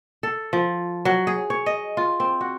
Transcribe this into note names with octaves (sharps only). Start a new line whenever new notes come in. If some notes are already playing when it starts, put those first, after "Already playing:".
A4
F3
F#3
G#4
C#5
D#5
F4
C4
F#4